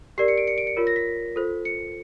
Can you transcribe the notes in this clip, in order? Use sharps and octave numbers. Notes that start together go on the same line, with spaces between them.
G4 A#4 D5 C7
C#7
D7
C#7
D7
C#7
F4 A#4 C#5
A#6
B6
F4 A4 C5
C#7